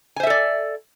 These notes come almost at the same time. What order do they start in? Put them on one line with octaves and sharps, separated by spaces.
G#5 C5 E5 A4 D5